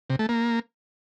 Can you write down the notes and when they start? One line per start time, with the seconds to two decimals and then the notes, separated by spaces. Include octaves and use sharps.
0.10 C3
0.19 A3
0.29 A#3